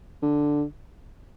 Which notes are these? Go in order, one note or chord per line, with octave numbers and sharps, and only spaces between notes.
D3